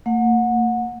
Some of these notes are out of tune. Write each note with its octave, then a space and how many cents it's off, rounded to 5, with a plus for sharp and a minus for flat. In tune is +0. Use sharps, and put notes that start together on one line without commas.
A#3 -45 F#5 -25